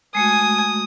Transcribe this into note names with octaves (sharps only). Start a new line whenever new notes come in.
G#3 A3 F#4 G#5 D#6